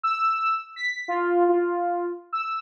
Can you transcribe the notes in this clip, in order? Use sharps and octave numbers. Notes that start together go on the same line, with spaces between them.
E6
B6
F4
F4
E6